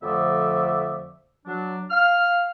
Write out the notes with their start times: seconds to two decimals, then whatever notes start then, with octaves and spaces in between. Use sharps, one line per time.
0.02 F2 D3 F3 A3 D5 E5
1.46 F#3 D4
1.90 F5 F6